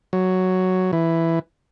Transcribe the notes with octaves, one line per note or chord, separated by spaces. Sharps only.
F#3
E3